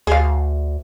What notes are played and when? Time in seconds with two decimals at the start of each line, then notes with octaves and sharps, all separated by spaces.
0.07 D2 G#4 F5